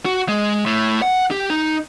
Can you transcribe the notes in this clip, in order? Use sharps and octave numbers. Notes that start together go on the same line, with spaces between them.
F#4
G#3
A2
F#5
G4
D#4